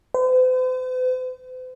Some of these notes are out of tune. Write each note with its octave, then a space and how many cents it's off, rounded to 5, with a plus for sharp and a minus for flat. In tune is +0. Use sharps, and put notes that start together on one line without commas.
C5 -45